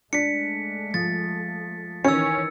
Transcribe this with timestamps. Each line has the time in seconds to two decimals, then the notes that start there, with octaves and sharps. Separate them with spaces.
0.13 G#3 A3 D4 B6 C#7
0.94 F3 A6
2.05 D#3 E3 C#4 E6 C#7